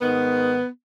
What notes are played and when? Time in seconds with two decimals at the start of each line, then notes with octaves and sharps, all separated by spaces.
0.01 G#2 D#3 B3